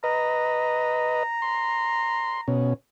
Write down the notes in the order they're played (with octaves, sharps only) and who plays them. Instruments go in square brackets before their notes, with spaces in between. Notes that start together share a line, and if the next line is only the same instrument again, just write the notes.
[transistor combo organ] B4 D#5 [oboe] A#5
[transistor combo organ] C6
B2 C#4